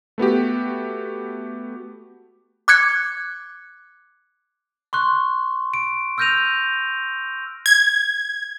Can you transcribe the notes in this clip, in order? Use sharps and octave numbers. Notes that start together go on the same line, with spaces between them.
A3 B3 F#4 G4
D6 F#6 G#6 C#7
C6 C#6 F#6
D7
E6 F6 G6 A#6 D#7 F7
G#6